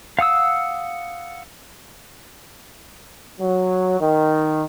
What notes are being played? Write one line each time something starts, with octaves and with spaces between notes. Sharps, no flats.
F5 F#5 D#6 E6
F#3
D#3